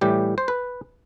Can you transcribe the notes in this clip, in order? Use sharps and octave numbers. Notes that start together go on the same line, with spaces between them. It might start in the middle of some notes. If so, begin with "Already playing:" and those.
A2 E3 G3 G4
C5
B4